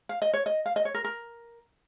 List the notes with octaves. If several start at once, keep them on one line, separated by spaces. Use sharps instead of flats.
F5
D#5
C#5
D#5
F5
D#5
C#5
A#4
A#4